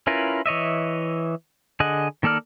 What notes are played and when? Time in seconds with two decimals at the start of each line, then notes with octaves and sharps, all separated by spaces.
0.07 C#4 E4 F4 A#4 B4
0.46 E3 C#5 D#5 E5
1.80 D3 G#4 D#5 F#5
2.23 D#3 A#3 A4 D5 F6